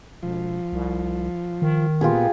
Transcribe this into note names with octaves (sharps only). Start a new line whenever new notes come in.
E1 F3
C2
D#3
A#2 B3 F4 G4 G#4